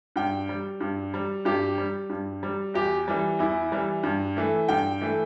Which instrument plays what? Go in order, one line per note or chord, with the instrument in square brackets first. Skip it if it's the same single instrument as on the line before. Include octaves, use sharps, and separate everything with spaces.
[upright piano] G2 G5
G3
G2
G3
G2 G4
G3
G2
G3
E2 G4
E3 G3
E2 E4
E3 G3
G2
E3 A3
G2 G5
E3 A3